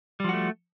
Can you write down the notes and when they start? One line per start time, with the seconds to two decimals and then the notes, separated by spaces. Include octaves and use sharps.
0.20 G3
0.24 F3
0.29 F#4
0.33 A3